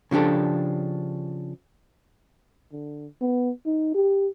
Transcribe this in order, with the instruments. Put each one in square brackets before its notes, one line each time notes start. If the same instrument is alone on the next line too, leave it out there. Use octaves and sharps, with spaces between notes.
[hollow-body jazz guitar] C#3 F3 D4 G4 A4
[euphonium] D3
B3
D#4
G4